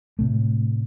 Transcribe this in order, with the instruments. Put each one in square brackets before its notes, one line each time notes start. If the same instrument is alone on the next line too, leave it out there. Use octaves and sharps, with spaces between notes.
[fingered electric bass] A2 C3 A3